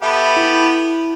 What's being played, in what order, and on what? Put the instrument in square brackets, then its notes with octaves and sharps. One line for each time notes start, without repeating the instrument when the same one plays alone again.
[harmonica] B3 G4 A4 [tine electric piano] E5 B5
[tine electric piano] E4